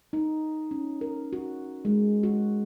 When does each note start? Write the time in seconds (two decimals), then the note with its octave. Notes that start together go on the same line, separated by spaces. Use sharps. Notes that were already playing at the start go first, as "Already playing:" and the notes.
0.13 D#4
0.71 C#4
1.01 A#4
1.33 F#4
1.85 G#3
2.23 F#4